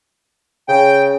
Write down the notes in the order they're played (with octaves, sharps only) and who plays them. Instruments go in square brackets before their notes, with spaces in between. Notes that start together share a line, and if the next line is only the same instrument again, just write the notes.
[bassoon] C#3 [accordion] G5